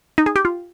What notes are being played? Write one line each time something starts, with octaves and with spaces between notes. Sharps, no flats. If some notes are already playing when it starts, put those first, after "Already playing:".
D#4
G#4
G4
F4